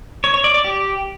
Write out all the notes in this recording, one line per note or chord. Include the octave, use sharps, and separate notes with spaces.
C#5
C#5
D5
D5
G4